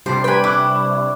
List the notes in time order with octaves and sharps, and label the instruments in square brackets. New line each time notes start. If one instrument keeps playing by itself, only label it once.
[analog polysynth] C3 G3 D4 [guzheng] C5
[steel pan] B4 G#5 [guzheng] G5 B5
[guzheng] E4 [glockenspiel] C#6 D6 F#6